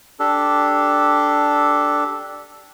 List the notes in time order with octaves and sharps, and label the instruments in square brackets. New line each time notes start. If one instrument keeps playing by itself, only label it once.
[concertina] D4 G4 A4